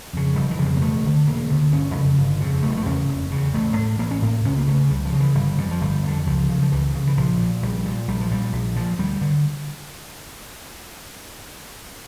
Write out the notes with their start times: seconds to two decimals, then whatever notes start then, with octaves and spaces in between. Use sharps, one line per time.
0.13 F2 C#3
0.36 F1 G3
0.51 E3
0.59 F2 C#3
0.66 G3
0.77 A#3
0.81 E1 A3
1.04 D2 D3
1.27 E1 A#3
1.49 D2 D3
1.72 G1 C#4
1.95 F2 C#3
2.18 G1
2.41 F2 C#3
2.63 F1 A3
2.70 G3
2.77 A3
2.86 E2 C#3 C#4
3.08 F1
3.31 E2 C#3
3.54 A1 A3
3.76 A2
3.99 A1 A#3
4.11 C#4
4.22 A2 A#3
4.44 C#2 C#4
4.58 A#3
4.67 C#3 A3
4.90 C#2 G3
5.05 F3
5.13 C#3
5.20 E3
5.35 G1 G3
5.58 F2 D3
5.61 E3
5.71 F3
5.81 G1 G3
6.03 F2 D3
6.26 C#2 F3
6.49 C#3
6.62 F3
6.72 C#2 E3
6.94 C#3
7.07 E3
7.17 A#1 F3
7.40 A#2
7.62 A#1 G3
7.85 A#2
8.08 A#1 G3
8.21 F3
8.31 A#2 G3
8.53 A#1
8.76 A#2 F3
8.99 D2 G3
9.21 D3